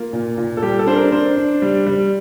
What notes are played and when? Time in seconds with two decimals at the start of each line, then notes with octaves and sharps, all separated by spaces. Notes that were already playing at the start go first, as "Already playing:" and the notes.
Already playing: A#3 F4
0.13 A#2
0.37 A#2
0.57 A4
0.62 G3 G4
0.79 A4
0.87 D4 C5
0.96 A#4
1.12 D4 C5
1.36 D4
1.62 G3
1.86 G3